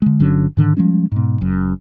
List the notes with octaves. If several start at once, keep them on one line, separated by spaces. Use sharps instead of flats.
D3 G#3
G1 D3 F#3 C#4
G#2 D3 D#3
F3 G3 G#3 C#4
G#2 B2
F#1 F#2